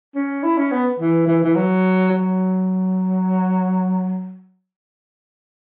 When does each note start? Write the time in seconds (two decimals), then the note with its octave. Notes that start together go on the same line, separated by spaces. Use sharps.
0.15 C#4
0.43 E4
0.57 C#4
0.71 B3
1.00 E3
1.27 E3
1.44 E3
1.56 F#3
2.12 F#3